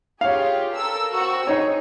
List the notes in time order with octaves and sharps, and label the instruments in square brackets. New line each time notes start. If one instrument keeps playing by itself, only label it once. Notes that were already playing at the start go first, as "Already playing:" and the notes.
[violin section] F4 G4 G#4 [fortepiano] C#5 F5
[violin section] A4 A#4 E6
C4 F#4 E6
[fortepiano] D#4 C#5 [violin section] G#4